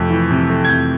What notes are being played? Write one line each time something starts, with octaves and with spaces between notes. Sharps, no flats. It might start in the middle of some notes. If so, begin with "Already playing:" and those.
Already playing: F2 C3 A3
E3
C3
A3
G#6
F2 G6